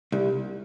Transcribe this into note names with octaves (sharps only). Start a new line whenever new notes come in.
C2